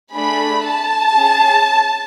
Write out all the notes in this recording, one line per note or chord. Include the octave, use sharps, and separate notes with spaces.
A3 D4 G#4 B5
A5
C#4 G#4